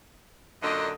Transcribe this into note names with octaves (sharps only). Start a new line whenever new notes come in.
F#2 A#2 D3 D#5